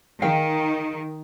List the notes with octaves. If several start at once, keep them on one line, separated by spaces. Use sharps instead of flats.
D#3 G#4 F5 G5